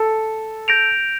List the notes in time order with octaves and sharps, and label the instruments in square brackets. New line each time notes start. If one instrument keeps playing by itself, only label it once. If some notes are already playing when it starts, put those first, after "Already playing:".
Already playing: [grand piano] A4
[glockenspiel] G6 A#6 D7 F7